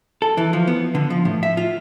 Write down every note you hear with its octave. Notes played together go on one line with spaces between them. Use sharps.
A4
E3
F3
B3
D3
F3
A2
E5
F4